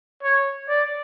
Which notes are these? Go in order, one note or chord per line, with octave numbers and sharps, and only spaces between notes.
C#5
D5